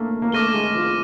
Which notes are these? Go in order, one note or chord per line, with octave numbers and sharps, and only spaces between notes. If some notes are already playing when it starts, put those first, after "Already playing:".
Already playing: A3 A#3
A#3
A3 D6 F6 A#6 D#7 G7
G#3
F3